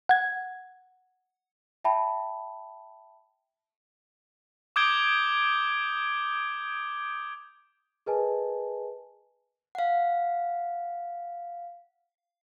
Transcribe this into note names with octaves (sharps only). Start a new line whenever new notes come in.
F#5 G#6
E5 G5 A5 B5
D6 D#6 G6 G#6 D7 G7
G#4 A#4 B4 D#5 G#5 A5
F5 F#5